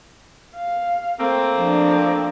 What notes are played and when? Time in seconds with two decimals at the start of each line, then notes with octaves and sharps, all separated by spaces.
0.57 F5
1.18 A3 A#3 C4
1.57 F3 D4